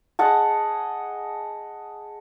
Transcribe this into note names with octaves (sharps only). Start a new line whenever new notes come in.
G#4 D#5 F#5 A5